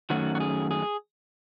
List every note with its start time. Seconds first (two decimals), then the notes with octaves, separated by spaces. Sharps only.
0.10 F#2 D#3 F#3 A3 C#4 F#4
0.35 F#4
0.40 G#4
0.71 G#4